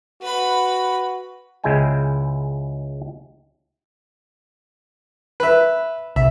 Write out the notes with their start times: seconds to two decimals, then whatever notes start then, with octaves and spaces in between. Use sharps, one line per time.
0.21 F#4 B4 B5
1.64 C#2 C#3 G#3 E4 G5 G#5
5.40 B4 E5
6.16 C2 E5